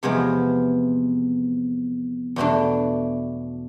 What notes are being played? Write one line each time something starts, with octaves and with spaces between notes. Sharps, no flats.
E2 C3 F3 G#3 B3
E2 B2 A3 D4